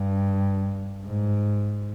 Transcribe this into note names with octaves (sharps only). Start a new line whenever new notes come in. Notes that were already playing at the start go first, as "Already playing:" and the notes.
Already playing: G2
G#2